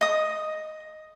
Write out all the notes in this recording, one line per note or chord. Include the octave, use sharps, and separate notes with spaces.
D#5 D#6